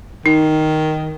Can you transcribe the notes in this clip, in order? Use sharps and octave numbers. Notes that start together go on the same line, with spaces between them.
D#3 D#4